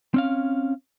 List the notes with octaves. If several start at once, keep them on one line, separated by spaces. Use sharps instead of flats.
C4 C#4 F5